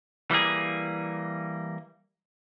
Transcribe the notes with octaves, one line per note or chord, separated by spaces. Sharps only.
E3 G3 A#3 G#4